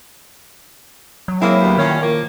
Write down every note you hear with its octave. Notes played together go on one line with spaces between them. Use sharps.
F#3
G#3 A#3 C4 E4
D2 B3 G4
A#2 D#3 C#4
F3 A#3